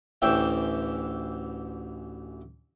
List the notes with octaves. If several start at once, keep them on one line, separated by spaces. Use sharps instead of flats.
A1 D2 E3 C#5 E5 G5